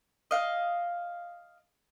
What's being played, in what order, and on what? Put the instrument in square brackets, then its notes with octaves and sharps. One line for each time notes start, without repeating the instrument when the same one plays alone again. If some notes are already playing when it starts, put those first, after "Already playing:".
[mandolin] D#5 F5